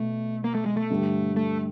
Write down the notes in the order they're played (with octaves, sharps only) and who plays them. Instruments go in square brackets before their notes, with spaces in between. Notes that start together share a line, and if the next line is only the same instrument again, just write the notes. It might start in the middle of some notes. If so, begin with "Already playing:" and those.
Already playing: [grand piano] B2 [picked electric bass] A3
[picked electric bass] A#3
A3
G#3
A3
[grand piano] G2 D3 G3
[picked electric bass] A3